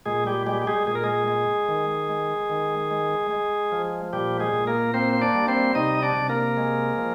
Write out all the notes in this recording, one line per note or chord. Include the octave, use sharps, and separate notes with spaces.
A#2 G#3 G#4
G3 G4
G3 G#3 G4
G4
G#3 G#4
A#2 G#4
A#4
G#3 G#4
G#3
D#3
G#3
D#3
G#3
G#3
F3
A#2 G3 G4
G#3 G#4
A#2
A#3 A#4
A#3 C4 C5
C5
D4 D5
G3
C4 C5
C3 D#4 D#5
D#5
D4 D5
C3
A#3 A#4
G#3
F3